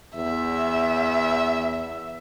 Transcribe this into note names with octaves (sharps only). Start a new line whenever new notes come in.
E2 E5